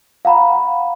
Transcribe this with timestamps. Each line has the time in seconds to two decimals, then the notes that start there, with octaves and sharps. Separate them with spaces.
0.25 F5 F#5 A#5 B5